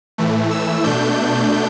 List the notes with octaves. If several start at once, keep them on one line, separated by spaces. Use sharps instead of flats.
A2 E3 A3
E6
B2 A3 D4 G6